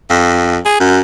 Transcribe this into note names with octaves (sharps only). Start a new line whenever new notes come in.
F2
G#4
F#2